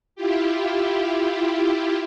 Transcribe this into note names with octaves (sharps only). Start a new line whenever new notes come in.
E4 F4 G4